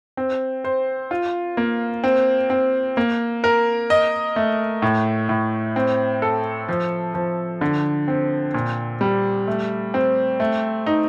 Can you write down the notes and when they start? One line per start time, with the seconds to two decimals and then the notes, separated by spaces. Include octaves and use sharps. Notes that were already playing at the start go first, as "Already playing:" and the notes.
0.17 C4
0.64 C5
1.11 F4
1.57 A#3
2.04 C4
2.50 C4
2.97 A#3
3.44 A#4
3.90 D#5
4.36 A3
4.82 A2
5.29 A2
5.76 C4
6.22 A4
6.69 F3
7.14 F3
7.61 D3
8.08 C4
8.54 A#2
9.01 G3
9.48 A3
9.94 C4
10.40 A3
10.86 D#4